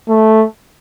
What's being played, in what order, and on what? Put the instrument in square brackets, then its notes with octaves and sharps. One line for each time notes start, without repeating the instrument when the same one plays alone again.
[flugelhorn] A3